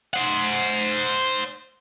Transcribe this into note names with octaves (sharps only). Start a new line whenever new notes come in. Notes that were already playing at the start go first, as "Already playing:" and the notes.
C5 F#5